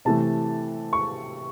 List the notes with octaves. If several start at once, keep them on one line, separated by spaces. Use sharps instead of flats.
C3 E3 A3 A5
C#6